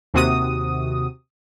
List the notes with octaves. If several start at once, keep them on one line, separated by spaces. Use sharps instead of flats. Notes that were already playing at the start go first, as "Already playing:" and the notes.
D#2 C3 F#4 D#6